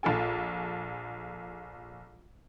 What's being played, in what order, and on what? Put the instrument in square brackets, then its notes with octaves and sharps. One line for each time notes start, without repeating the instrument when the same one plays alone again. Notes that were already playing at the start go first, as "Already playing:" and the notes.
[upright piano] A#1 F4 A4 G#5